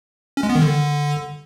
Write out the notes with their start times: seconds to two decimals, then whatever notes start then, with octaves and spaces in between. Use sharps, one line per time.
0.37 C#4
0.43 G#3
0.49 B3
0.56 D#3
0.62 D3